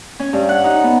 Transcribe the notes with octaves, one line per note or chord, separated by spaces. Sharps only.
C#4
G2
F#5
D#4
B3